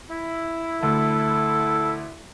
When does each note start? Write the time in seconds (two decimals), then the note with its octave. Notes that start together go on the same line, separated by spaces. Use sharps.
0.09 E4
0.83 D2 A4